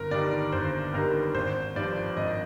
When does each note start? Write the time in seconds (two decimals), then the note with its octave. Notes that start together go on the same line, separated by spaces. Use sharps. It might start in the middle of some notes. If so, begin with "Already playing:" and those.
Already playing: G1 A#4
0.11 G2 D#3 G3 D5
0.52 G1 C5
0.94 G2 D#3 G3 A#4
1.34 G#1 C5
1.76 G2 F3 D5
2.17 G#1 D#5